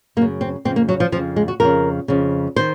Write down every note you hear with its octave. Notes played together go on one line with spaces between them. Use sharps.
F#2 C#3 A#3
C4
F2 C#3 C4
A#3
F#3
F3
F2 C#3 F3
G#3
F#4
F2 C#3 A#4
F2 C#3
D#3 C5